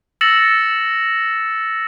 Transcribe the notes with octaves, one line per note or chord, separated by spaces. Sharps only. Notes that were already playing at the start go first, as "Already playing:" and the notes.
E6 A6 A#6 C#7 E7 F#7